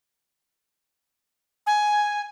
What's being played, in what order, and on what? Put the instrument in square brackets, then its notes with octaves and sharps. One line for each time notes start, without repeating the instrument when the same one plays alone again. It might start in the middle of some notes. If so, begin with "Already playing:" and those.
[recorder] G#5